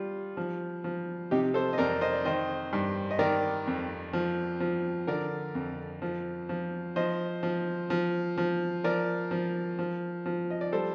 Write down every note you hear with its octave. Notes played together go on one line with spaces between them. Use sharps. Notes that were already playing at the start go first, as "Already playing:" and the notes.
Already playing: G3 F4
F3
F3
C3 D#4 G4
A4 C5
D#5
F2 A#4 D5
C5 D#5
D5
D#3 C5 D#5
G2
D#5
D#3 A#4 D5
F2
F3
F3
D3 A#4 D5
F2
F3
F3
F3 C5 D#5
F3
F3
F3
F3 A#4 D5
F3
F3
F3
D#5
D5
G3 A4 C5